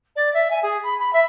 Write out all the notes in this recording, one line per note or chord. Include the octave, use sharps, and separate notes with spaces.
D5
E5
G#5
G#4
B5
B5
E5